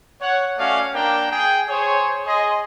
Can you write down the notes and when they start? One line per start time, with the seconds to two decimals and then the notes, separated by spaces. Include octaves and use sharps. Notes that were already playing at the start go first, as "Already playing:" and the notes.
0.21 C#5 F#5
0.57 A3 C#4 F#4 D5 F5
0.93 A#3 D4 A#4 G5
1.30 G#4 G5
1.68 G#4 C5 C#5
2.26 G#4 D#5 C6